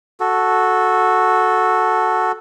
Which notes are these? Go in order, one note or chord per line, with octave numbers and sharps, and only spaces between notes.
F#4 A4